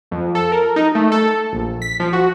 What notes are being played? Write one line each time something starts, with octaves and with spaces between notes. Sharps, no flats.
F2
A4
A#4
D#4
A3
A4
A#1
B6
F3
F#4